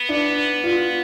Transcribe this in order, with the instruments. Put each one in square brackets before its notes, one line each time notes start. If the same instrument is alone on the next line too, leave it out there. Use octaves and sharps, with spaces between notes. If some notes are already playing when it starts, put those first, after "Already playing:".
Already playing: [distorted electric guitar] B3
[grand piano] D4
F4